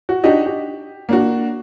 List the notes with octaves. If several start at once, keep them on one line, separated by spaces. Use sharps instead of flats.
F#4
D4 D#4 F#4 G4 D#5
G4
A#3 D4 F#4